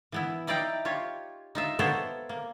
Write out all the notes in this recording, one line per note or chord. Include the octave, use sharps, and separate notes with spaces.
E3 B3 E4
D#4 E4 D5 F5 G5 A#5
F4 G4 C#5
D#4 F4 E5
A#3 B3 A4 C5 C#5 E5
A#3